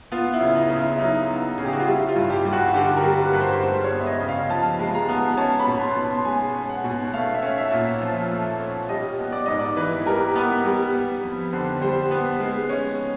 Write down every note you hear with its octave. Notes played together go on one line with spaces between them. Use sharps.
B3 F4
E4
C#3
D#4
C#3
E4
E4
F#3 D#4
B3
C#3 G#4
G4
F#4
F4
G3 E4
F4
G2
G4
G2
F#4
D3 G4
A#4
G3
B4
G2 B4
C5
G#3 C5
C#5
B3
E5
D#5
C#3
F5
F3 A5
G#3
A#5
B3
C#4 A5
B5
B2
C6
B2
C6
G#3 G#5
C#4
F#5
B2
A3 F5
E5
C#4
E5
A#2
F3
A3
C#4
G3 D#5
B3
D5
G#2 D#5
D5
E3 B4
G3 A#4
B3 B4
G3
B3
F2
D3 C5
G3 C5
B3 B4
G#3
C#4